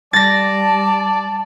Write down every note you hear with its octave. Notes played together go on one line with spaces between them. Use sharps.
G3 D5 A5 A6 A#6